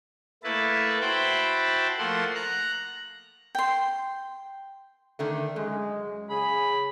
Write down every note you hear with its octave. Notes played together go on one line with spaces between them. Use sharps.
A3 A#3 E4 B4 A5
E4 F#4 C5 G5 A5 B5
F3 A3 A#3 F#5 C6
A#5 F#6
G5 C6
D3 D#3 A3
F#2 G#3
C#3 G#4 B5